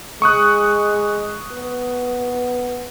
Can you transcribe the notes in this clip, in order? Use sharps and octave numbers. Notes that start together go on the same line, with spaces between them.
G#3 C#6 D#6 F#6
B3